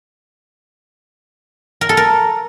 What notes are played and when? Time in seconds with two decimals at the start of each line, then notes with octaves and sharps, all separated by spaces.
1.81 A#4
1.89 A4
1.97 A#4